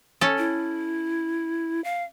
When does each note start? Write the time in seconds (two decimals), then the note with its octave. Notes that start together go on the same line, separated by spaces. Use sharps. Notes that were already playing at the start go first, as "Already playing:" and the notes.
0.21 C#4 A4
0.38 E4
1.84 F5